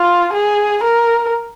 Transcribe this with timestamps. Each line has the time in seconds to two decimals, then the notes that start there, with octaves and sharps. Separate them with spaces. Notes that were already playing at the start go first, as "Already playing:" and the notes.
Already playing: F4
0.33 G#4
0.84 A#4